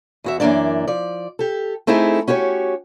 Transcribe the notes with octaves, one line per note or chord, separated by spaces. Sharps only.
E2 F#4 E5
F#2 E3 A#3 D4 D5
F3 D5
G4 A4
A3 C4 D#4 E4 G#4 A4
C#4 F#4 G4 B4 C#5